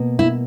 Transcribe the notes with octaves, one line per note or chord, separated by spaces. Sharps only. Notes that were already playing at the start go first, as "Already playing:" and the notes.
Already playing: B2 A#3
E4